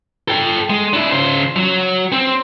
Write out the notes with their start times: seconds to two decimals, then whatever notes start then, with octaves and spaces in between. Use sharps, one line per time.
0.28 A4 G5
0.70 G#3
0.93 D4 E4
1.11 C#3 C5
1.56 F#3
2.12 C4